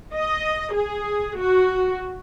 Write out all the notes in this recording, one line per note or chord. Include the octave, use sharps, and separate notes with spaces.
D#5
G#4
F#4